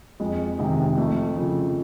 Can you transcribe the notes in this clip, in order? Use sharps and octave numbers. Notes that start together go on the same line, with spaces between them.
F2 G#3
C3 D#3 G#3
F2 A3
C#3 F3